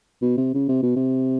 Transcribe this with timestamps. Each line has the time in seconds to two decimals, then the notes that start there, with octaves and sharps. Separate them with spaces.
0.22 B2
0.37 C3
0.54 C#3
0.68 C3
0.83 B2
0.96 C3